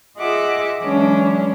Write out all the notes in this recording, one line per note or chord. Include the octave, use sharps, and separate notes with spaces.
F4 G#4 D#5 E5 F#5 D6
E3 F#3 G#3 C#4 D4